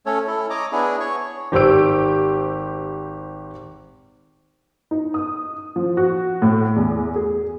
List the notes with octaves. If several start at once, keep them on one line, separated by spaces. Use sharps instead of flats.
A3 C#4 A4 C#5
E4 A4
C#5 D#5 A#5 D6
B3 D4 E4 G#4
C#5 C#6
G#1 G4 C5 E6 D7
D#4
D#6
F3
F#4
A2
E2
G#4